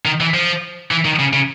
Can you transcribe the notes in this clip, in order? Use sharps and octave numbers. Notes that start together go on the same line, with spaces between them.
D#3
E3
F3
E3
D#3
C#3
C#3